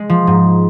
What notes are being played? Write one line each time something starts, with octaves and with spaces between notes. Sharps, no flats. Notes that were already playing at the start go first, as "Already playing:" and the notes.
Already playing: G#3
F3
G#2